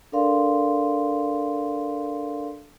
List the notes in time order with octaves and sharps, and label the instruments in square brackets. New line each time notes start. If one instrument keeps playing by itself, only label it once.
[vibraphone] D4 A4 A#4 D5 F5 C6